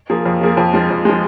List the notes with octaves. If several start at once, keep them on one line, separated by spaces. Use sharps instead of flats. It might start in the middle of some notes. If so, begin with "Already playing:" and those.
F3 A#3 G#4
F2
F3 A#3 G#4
F2
F3 G#3
F2
F3 G#3